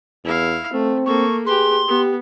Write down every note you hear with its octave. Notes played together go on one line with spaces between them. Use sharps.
E2 E4 F5
A3 C4
A#3 A4 C#6
G4 G#4 B4 C6
B3 G4